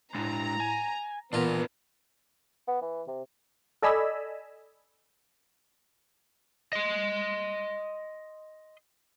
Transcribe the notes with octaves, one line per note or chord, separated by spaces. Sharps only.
A2 G#3 D4 A#5
G#5
A#2 E3 B3 D4 F4 A#4
B3
E3
C3
A4 D5 D#5 G#5 B5 E6
D#5 C6